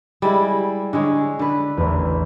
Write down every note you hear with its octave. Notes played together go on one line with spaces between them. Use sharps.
G3 G#3 E4
D3 G#3 C#5
D3 B4
A1 E2